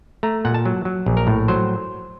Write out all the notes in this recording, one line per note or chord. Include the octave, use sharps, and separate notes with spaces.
A3 A#5
A#2 F#5
A5
F#3
F#3
A#1
A#4
A2
F#3 C5